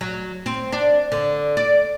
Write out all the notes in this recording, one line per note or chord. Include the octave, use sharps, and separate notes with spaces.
F#3
C4
D4
D3
D5